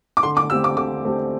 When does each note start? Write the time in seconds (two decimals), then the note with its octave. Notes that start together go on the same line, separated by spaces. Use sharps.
0.17 D6
0.23 D3 C6
0.37 D6
0.50 A3 C4 G4 E6
0.64 D6
0.77 D3 D6
1.05 A3 C4 G4